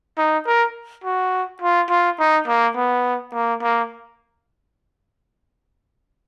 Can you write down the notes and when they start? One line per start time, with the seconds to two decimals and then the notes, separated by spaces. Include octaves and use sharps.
0.18 D#4
0.47 A#4
1.04 F#4
1.61 F4
1.90 F4
2.19 D#4
2.47 A#3
2.76 B3
3.34 A#3
3.62 A#3